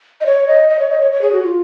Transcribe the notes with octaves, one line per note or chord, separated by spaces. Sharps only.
D#5
C#5
D#5
D#5
C#5
D#5
C#5
C#5
G#4
F#4
F4